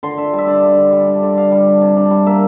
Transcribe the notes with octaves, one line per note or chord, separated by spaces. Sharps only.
D3 C6
D3 E5
G3
E5
D4 D5
D3
D3
G3
D4
D3
D3 F5
G3
D4
C3
D4
G3
A#3 E5